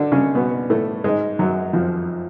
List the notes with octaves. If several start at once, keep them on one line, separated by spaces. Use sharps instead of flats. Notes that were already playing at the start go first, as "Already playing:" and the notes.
Already playing: D3 D4
C#3 C#4
B2 B3
A2 A3
G#2 G#3
F#2 F#3
F2 F3